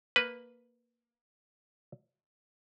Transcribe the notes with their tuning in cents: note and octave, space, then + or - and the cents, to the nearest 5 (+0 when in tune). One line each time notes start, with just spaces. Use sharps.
A#3 +0 B4 +0